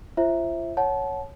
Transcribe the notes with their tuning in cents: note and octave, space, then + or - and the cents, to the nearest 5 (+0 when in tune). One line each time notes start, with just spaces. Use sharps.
F4 -40 C5 +25 E5 +0
C#5 +0 F#5 +10 A5 -25